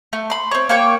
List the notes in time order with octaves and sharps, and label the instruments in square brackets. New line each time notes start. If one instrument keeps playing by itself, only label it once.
[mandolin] A3
B5 C6
C4 C#5
A#3 C#5 G5 C#6